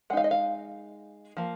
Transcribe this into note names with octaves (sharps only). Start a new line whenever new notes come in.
G#3 D#4 F5 F#5
D#5
F5
F3 A#3